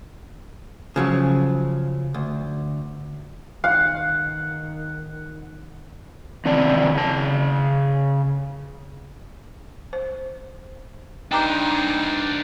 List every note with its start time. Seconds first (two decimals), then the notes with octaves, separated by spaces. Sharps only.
0.96 C#3 F3 F#3
2.14 D2
3.64 D#3 F5 F#5
6.45 E2 C3 D#3 D5 A5
6.94 C#3 A5
9.93 C5
11.32 G2 D4 D#4 C5 G5 A#5 D6